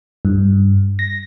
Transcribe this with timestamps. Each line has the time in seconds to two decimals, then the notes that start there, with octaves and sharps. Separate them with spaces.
0.25 G2
0.99 A#6